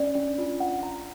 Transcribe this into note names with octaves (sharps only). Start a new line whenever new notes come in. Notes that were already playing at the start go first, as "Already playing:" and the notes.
Already playing: C#4 D5
D4
F4
F#5
A#5